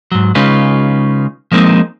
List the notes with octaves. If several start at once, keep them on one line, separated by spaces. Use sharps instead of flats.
G#2 F#3
C#3 G#3 C#4 D#4 F4 B4
F3 G#3 A#3 C4 D#4